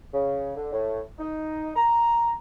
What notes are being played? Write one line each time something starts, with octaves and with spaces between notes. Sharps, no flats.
C#3
D3
A2
D#4
A#5